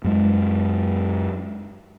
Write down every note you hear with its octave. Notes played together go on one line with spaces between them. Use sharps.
F#2 G#3